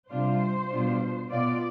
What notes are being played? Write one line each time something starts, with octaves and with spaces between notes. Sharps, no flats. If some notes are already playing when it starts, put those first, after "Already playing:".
C3 G3 D4 F4 C5
B2 G3 D4 F4
B2 B3 F4 D5